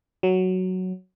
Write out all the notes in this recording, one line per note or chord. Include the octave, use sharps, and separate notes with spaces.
F#3